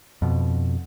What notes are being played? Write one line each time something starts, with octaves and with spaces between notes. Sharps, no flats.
F2 B2